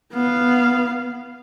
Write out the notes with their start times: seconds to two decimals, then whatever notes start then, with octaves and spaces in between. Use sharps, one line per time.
0.13 B3 F5